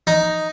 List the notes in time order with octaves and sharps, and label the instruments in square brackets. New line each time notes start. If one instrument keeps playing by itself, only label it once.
[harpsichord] D#4